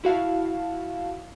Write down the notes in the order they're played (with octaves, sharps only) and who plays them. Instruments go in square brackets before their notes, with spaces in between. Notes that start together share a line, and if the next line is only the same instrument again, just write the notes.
[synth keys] E4 F#4 F5 A5